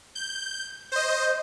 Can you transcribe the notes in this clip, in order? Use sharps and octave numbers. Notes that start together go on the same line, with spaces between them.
G6
C5 D#5 G6